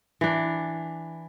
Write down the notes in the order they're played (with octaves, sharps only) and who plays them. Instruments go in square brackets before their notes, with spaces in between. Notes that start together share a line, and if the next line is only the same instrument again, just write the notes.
[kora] E3 D4